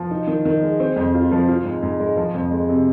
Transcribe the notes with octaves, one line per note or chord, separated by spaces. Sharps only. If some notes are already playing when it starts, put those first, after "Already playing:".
Already playing: F3
D#4
D#3
D#3
G#3
C4
F2
F4
F3
F4
G#2
G#2
G#3
F3
F2
G#3
C3